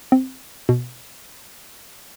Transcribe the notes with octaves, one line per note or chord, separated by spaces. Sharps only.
C4
B2